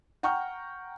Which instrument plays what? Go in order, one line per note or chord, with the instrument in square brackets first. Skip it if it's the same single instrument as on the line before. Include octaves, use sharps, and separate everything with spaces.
[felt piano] F#5 G5 A#5 C#6 F6 G6